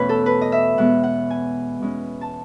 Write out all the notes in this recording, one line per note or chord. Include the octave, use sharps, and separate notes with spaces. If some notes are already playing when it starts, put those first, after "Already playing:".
Already playing: E2 B2 A3 C#4 B4 C#5
A4
B4
D#5
E5
B2 G#3 B3 F#5
F#5
G#5
B2 G#3 C#4
A5